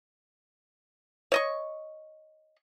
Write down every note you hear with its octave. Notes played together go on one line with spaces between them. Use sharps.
C#5 D#5 C#6